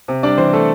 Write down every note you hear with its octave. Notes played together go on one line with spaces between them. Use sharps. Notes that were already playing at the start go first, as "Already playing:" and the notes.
C3
G3 D4 D5
E3 C4 C5
A3 A4